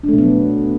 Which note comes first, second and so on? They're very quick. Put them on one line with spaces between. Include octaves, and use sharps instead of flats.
D4 A3 B2 B3 F#3